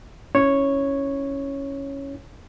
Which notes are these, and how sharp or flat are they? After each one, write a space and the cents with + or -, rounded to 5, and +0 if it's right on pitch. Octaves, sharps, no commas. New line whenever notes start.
C#4 +0 E4 -20 C#5 -5